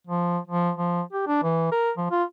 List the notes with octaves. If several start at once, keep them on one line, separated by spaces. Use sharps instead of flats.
F3
F3
F3
G4
D4
E3
A#4
F3
F4